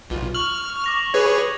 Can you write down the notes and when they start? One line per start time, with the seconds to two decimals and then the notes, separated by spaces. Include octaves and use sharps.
0.10 B1 F4
0.35 C#6 F6 F#7
0.84 D6 A#6 F7
1.14 G#4 B4 C#5 G#6